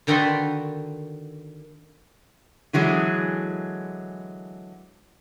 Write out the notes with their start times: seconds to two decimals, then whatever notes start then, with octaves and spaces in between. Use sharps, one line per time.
0.07 D3 D#3 F#4 A4 B4 C6
2.73 D3 E3 F#3 G#3 G#4